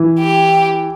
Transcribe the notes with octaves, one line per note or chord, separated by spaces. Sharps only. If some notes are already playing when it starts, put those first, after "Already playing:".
Already playing: E3
G4